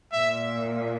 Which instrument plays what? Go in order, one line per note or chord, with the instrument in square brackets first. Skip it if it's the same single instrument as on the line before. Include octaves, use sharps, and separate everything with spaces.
[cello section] A#2 [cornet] E5